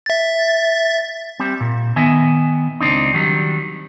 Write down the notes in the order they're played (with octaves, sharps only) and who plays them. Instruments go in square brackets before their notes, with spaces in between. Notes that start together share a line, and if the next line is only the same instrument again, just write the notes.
[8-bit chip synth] E5 A6
[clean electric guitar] G3 C4
A#2
D#3 B3 D#5 E5 G#5
C#2 C4 D4 D#4
D#3 F#3 G3